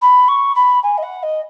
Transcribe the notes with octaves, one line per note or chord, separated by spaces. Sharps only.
B5
C#6
B5
G#5
D#5
F#5
D#5